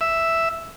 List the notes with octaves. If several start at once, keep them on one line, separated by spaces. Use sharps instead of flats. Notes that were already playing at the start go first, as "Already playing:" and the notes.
E5